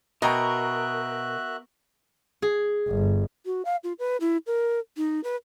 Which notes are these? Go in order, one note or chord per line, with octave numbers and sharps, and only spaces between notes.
B2 F#4 A#4 D#5 E5 G5 A#5 F#6
G#4
G1
F#4
F5
F4
B4
E4
A#4
D#4
B4